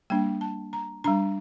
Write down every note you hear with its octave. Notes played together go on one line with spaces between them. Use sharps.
G3 A#3 D4 G5
A5
A#5
G3 D4 A#5